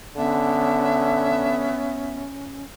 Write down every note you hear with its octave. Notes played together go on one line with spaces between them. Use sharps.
D3 B3 C#4 E5